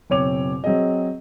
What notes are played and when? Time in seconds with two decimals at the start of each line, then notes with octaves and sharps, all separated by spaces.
0.10 F#1 B2 C4 C#5 D6 F7
0.64 F#3 C4 G#4 D#5